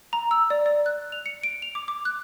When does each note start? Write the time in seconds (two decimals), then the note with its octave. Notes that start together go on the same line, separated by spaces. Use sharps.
0.13 A#5
0.31 E6
0.50 D5
0.66 D5
0.86 F#6
1.12 F7
1.26 C#7
1.43 D7
1.62 F7
1.75 D6
1.88 D6
2.05 F#6